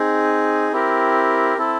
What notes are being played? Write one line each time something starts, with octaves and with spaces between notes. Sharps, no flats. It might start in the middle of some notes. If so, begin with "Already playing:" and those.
Already playing: C4 D#4 G#4
C4 E4 G4 A#4
C4 E4 A4